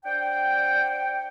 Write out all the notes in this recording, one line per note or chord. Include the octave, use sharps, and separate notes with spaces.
D4 C5 F#5 G5